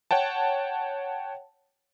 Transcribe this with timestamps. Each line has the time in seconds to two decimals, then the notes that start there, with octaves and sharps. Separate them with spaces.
0.11 C#5 F#5 G5 A5